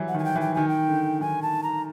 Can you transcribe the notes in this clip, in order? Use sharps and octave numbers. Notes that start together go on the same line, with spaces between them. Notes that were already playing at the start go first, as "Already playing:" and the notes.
Already playing: E3 F#3 G3
F#5
D#3 G#5
G5
E3
G5
D#3 G#5
G5
D3
D#3 G#5
A5
A#5